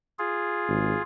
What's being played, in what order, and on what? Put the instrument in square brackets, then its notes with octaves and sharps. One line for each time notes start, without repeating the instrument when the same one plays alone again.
[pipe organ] F4 G#4
[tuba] G#1